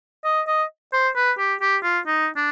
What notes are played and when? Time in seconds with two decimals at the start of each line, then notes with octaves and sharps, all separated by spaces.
0.25 D#5
0.47 D#5
0.93 C5
1.16 B4
1.39 G4
1.61 G4
1.83 F4
2.07 D#4
2.36 D4